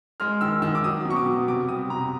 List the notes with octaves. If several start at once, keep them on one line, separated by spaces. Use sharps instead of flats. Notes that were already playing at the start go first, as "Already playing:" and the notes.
G#3 F6
D#3 E6
D#3 E6
D6
F#3 D#6
B2
C#6
D6
B2
C3 D6
G3 D#6
C3 A#5